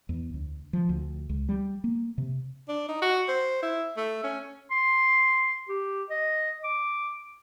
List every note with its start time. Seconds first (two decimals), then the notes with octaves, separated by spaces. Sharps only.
0.09 E2
0.34 D2
0.73 F3
0.89 D2
1.29 C#2
1.49 G3
1.84 A#3
2.18 C3
2.69 D4
2.89 D#4
3.02 F#4
3.29 C5
3.62 E4
3.97 A3
4.24 C#4
4.71 C6
5.69 G4
6.10 D#5
6.64 D6